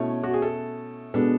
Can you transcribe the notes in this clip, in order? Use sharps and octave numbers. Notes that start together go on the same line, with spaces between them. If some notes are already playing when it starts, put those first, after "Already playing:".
Already playing: B2 A3 C#4 E4 C#5
F#4
G#4
A4
B2 G#3 B3 D4 A4